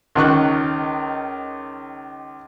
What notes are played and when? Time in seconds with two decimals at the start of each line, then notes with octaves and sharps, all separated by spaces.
0.15 C#2 D#3 C#6 F#6